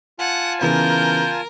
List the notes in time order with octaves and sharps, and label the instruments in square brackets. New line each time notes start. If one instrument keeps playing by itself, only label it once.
[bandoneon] F4 G#5 A5 [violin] F#5
[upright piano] C#3 E3 B3 [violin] A#4 [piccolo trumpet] G6